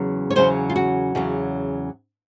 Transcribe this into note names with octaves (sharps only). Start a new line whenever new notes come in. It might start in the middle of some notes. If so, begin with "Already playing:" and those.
Already playing: E2 C#3 F#3
C#5
E2 C#3 F#3 C5
F4
F#4
E2 C#3 F#3